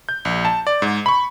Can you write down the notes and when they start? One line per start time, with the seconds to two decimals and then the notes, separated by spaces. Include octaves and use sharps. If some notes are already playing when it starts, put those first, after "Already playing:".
0.09 G6
0.25 A#1
0.45 A5
0.67 D5
0.82 G#2
1.06 B5 C#6